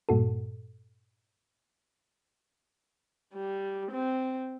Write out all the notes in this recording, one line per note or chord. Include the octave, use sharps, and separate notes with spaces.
G2 A#2 F#4 A4
G3
C4